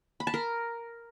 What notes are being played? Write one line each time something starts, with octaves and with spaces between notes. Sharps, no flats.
B5
A5
A#4